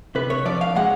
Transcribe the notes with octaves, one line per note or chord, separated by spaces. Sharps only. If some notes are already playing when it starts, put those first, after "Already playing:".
C3 B4
C#5
F3 D5
F5
G#3 F#5